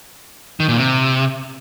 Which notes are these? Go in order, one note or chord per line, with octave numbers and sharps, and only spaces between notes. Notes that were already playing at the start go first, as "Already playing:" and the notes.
D#3
A#2
C3